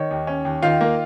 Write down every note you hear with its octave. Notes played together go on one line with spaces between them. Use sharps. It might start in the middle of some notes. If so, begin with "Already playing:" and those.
Already playing: D#3 C#5
D#2
C#4
D#2
D#3 F4 F5
A#3